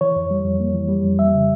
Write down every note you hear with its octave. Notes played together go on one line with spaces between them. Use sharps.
E3 C#5
F2
G3
F2
A#3
E3
G3
F2
G3 E5
C#3